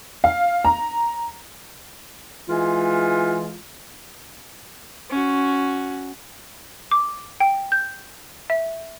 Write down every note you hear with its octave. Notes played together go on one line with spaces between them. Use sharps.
F5
A#5
E3 G#3 F4
C#4 F#4
D6
G5
G6
E5